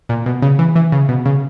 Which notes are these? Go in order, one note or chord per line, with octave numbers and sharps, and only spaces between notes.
A#2
B2
C#3
E3
E3
C#3
B2
C#3